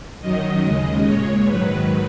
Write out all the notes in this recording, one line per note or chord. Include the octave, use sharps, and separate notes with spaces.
F#2 D#3 F#3 D#5
D#2 C#3 G#3 D#5
A#2 G#3 C#5
G#2 D#3 F#3 B4